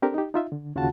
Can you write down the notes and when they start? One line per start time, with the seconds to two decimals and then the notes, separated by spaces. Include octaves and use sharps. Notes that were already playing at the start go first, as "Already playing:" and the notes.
0.02 C4 D4 G4 A4 A#4
0.14 D#4 G4
0.34 D#4 F4 E5
0.52 D3
0.75 D#2 C#3 F4 F#4 F#5 A5